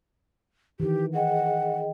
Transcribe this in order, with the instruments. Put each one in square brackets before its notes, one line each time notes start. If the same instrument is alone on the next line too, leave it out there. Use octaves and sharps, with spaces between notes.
[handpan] D#3 E3 [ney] G4
[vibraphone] G#4 D#5 G5 [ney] F#5